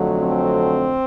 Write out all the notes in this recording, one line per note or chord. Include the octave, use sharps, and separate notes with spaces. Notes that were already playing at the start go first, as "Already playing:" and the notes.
Already playing: F2 D3 F#3 A3
C4